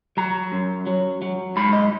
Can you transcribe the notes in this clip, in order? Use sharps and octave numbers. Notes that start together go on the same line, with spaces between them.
F#3 A#5
F#2
F#3
F#3
G#2 B5
D#5